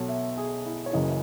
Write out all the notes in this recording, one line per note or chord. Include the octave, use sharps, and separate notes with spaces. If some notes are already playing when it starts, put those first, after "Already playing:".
Already playing: B1 B2 F#3 A4 C#5
E5
G#4
E4
C#5
F#1 F#2 C#3 E3 D#5